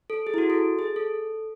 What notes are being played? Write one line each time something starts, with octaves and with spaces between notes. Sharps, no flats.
A4
G#4
E4
F#4
A4
G#4
A4